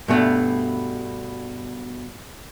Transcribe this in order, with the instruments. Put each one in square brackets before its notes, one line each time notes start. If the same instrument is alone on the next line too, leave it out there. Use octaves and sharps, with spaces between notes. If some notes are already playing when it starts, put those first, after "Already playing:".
[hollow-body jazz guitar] G2 B2 A3